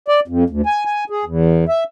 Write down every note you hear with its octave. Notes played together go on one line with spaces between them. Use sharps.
D5
F2
D2
G#5
G#5
G#4
E2
E5